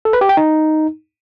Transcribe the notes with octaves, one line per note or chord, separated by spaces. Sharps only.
A4
B4
G4
G5
D#4